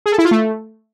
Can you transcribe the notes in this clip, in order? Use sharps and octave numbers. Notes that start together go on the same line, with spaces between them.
G#4
A4
E4
F4
A3